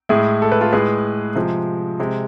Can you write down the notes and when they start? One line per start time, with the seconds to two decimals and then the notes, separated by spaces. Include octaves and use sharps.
0.09 A2 G#3 E4 G#4
0.42 A4
0.52 B4
0.61 F4 A4
0.73 A2 G#3 G#4 B4
1.35 C3 F3 G#3
2.00 C3 G#3